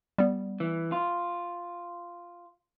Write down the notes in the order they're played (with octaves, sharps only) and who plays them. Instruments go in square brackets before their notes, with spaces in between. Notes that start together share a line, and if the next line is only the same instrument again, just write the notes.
[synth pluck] G3 B3
[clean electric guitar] E3
F4